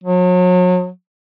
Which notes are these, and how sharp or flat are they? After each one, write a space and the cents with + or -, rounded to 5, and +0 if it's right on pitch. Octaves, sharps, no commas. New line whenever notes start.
F#3 -35